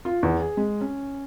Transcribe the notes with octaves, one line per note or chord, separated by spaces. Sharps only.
F4
E2
G#4
G#3
C#4